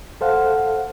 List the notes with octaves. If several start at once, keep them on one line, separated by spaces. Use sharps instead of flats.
A4 C5 F5 F#5